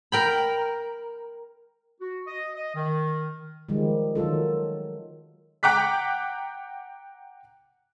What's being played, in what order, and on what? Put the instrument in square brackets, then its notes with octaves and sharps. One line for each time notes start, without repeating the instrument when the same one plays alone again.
[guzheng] A#4 G5 B5
[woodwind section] F#4
D#5
D#5
D#3
[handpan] D#3 F3 G3 G#3
D#3 F#3 F4 A4
[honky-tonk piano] F#5 G5 A#5 D6 F#6 B6